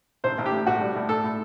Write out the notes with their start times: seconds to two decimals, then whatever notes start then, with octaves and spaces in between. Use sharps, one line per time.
0.24 A1 C5
0.38 A1
0.46 G4
0.52 A2
0.67 A2 F#4
0.80 G3
0.94 A2
1.09 A2 A4
1.24 A2